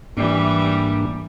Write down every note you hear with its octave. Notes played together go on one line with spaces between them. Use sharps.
G#2 E3 G3 A#3 D4